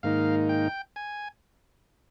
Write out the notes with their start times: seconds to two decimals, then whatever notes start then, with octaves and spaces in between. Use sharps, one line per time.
0.03 G#2 D#3 A#3 D#4 F5
0.49 G5
0.96 G#5